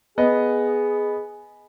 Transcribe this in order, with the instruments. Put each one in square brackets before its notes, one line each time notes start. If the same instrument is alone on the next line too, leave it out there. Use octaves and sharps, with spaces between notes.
[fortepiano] B3 D#5 [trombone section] G#4